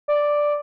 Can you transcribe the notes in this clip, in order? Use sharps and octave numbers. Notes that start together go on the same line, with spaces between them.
D5